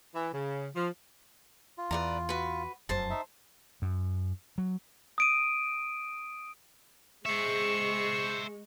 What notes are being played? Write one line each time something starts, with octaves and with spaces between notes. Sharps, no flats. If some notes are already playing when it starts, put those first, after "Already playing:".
E3
C#3
F3
F4
E2 B4 D5 A#5
F#4 B4
F1 F#2 C5 A5
D#4 E5
F#2
F#3
D#6 D7 D#7
G#3 C5 E5 C#6